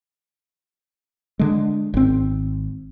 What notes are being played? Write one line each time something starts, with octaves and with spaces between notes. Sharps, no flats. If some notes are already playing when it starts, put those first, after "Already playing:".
D3 G#3
G#1 C4